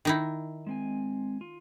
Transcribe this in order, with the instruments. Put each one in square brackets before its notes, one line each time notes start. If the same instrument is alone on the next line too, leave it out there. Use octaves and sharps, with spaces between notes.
[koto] D#3 D#4 E4
[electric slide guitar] G#3 C4 G#5
F4